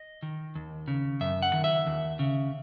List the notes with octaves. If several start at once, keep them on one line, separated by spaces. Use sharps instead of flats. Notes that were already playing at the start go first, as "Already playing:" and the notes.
Already playing: D#5
D#3
D#2
C#3
F#2 E5
F#5
D#3
E5
D#2
C#3